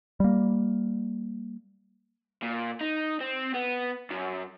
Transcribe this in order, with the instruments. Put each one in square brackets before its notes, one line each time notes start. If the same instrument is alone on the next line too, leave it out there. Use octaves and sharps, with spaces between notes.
[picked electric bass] G3 A#3
[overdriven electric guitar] A#2
D#4
C4
B3
F#2